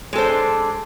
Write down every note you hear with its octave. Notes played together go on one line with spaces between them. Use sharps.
G#3 D4 A4 C5